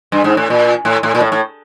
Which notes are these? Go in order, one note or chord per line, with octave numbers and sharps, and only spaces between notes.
G2
G#2
A2
A#2
A2
A2
A#2
A2
A2